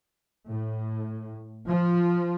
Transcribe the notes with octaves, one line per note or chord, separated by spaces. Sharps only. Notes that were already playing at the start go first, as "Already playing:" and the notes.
A2
F3